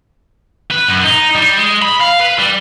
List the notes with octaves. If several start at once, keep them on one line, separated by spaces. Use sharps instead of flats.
B4
F#2
D#4
G3
G#3
B5
F5
B4
G3